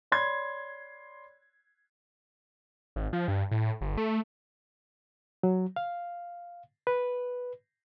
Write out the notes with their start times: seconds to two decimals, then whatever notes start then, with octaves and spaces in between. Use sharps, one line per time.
0.12 C#5 D5 B5 C6 G#6
2.96 G#1
3.13 F3
3.28 G2
3.51 A2
3.81 G1
3.97 A3
5.43 F#3
5.76 F5
6.87 B4